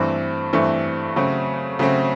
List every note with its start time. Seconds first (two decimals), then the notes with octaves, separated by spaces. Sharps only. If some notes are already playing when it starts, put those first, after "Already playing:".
Already playing: G2 E3 A3 C4
0.53 G2 E3 A3 C4
1.16 C#3 F#3 A3 C4
1.79 C#3 F#3 A3 C4